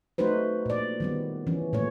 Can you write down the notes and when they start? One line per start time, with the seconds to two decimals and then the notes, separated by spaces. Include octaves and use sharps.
0.18 A3 D#4 F#4 B4 C5
0.66 A#2 D5
1.00 D#3 G3 B3
1.47 E3 C#4
1.73 A#2 A3 C#5